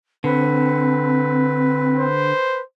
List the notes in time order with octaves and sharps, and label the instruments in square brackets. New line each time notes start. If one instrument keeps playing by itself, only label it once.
[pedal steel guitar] D3 [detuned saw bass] C4 [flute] B4
[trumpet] C5